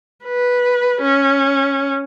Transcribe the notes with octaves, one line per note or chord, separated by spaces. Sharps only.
B4
C#4